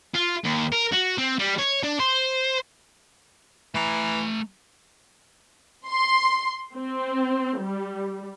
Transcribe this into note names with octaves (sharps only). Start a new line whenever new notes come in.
F4
D#2
A#4
F#4
C4
G3
C#5
D4
C5
E3 A3 A#5
C6
C4
G3